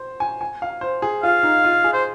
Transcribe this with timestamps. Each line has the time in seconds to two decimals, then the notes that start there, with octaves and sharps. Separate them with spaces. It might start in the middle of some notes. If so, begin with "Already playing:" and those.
Already playing: C5
0.20 G#5
0.41 G#5
0.62 F5
0.81 C5
1.02 G#4
1.23 F4 F5
1.43 D#4
1.64 F4
1.84 G#4
1.93 C5